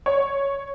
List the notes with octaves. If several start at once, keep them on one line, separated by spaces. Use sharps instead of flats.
C#5